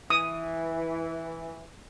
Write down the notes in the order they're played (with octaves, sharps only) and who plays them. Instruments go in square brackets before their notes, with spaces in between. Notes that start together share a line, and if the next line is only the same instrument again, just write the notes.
[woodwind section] E3 [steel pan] D#6